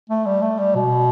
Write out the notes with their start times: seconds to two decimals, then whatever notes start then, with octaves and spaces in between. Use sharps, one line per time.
0.10 A3
0.26 G3
0.42 A3
0.59 G3
0.75 B2